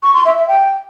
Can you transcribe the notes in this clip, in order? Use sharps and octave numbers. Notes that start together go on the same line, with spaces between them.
C#6
C6
E5
E5
G5